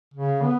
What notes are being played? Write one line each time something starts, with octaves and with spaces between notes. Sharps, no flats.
C#3
B3